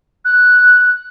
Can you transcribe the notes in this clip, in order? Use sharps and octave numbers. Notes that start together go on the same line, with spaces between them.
F#6